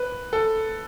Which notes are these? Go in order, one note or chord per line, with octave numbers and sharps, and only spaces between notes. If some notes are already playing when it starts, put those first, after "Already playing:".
Already playing: B4
A4